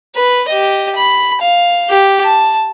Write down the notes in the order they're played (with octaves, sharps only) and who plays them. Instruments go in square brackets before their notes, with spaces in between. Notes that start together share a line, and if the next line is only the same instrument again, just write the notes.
[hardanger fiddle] B4
G4 D#5
B5
F5
G4
A5